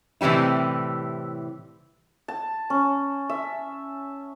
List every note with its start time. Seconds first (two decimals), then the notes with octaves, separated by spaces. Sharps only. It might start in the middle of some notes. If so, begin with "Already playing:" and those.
0.21 A2 C3 E3 G3 E4
2.28 A5
2.70 C#4
3.30 E5